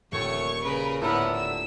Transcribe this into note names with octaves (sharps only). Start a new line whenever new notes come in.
D#1 D2 A3 C#5 C#6
C#3 A#4 B4
A2 D3 B3 A#4 E5 F#5
E6